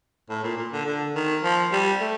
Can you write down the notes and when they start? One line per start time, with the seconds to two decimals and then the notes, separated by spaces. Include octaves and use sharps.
0.29 A2
0.44 A#2
0.57 A#2
0.72 D3
0.86 D3
1.15 D#3
1.44 F3
1.72 G3
2.00 A3